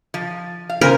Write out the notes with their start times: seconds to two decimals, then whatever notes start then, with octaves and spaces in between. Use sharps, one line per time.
0.14 F3
0.69 F5
0.81 C#3 A#4 C5 G#5